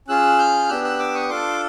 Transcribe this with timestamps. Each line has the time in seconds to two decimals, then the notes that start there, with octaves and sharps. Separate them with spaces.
0.08 C#4 F4 G#4 E6 F#6
0.39 F6 G6
0.69 B3 D4 G4 E6 F#6
0.84 E6 F#6
0.99 D6 E6
1.14 C#6 D#6
1.29 D4 F4 A4 C6 D6